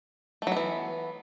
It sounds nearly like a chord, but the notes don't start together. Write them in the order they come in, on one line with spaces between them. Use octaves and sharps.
A3 F#3 B3 E3